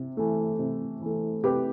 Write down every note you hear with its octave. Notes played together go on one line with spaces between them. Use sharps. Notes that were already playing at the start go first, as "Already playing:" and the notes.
Already playing: C3
E3 A3
C3
E3 A3
C3 G4 B4